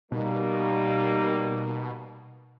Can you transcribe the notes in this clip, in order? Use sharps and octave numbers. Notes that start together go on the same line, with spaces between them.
B2 G3 A#3 D#4